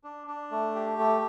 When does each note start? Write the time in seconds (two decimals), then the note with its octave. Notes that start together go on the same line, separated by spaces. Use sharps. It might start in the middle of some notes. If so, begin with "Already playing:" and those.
0.04 D4
0.27 D4
0.51 A3
0.75 G4
0.99 A3